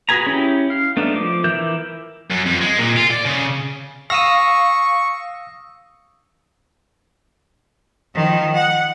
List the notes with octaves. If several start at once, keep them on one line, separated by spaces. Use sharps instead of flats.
F#4 G#4 B4 G#5 A#5
C#4 E4 G4
F5
A3 B3 D4 D#4
F3 D6
E3 A#4 E5 D6 G6
F#2
F2
G#3
A#2
F4
D5
C#3
F5 C#6 D#6 E6 A#6
D#3 F3
F#5